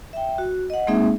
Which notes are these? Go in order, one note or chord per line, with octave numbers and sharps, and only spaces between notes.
E5 G5
F#4
D#5 F#5
G#3 A#3 C4 D#4 G#4 E5